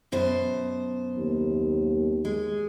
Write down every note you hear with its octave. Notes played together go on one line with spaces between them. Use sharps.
F#2 B2 C5
D#2
G#3